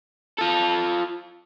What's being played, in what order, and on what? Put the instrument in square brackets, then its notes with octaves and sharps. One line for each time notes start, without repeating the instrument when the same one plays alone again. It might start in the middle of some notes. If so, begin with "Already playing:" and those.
[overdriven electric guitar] F4 A4